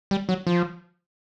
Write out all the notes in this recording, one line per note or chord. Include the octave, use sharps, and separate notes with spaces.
G3
F#3
F3